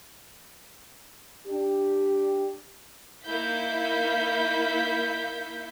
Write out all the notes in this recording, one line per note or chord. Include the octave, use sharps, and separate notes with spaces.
D4 G4
A#3 D#4 E4 F5 G6 B6